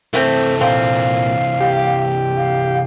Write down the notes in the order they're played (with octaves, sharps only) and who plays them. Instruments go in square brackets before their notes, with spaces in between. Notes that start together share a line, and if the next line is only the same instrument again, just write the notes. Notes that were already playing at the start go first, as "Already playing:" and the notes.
[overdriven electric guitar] C3 E3 [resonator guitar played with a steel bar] A3 B3 C4
[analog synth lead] A#2 [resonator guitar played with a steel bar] C4 [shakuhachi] F5
[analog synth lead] G4
[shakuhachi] F5